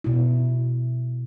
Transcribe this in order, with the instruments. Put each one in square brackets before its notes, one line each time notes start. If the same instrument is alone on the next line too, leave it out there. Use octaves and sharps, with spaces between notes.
[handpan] B2 E4